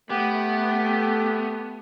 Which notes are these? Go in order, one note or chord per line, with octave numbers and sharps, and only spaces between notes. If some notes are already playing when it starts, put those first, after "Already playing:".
A3 B3 G4